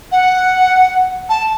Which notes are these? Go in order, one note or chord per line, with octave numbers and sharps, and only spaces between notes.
F#5
A5